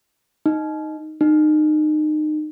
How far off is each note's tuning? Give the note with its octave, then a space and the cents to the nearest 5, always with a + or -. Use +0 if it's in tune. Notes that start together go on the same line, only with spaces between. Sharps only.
D#4 +0
D#4 -30